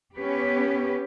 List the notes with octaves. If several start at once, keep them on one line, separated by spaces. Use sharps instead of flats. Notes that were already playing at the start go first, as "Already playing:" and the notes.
B3 C#4 G4 B4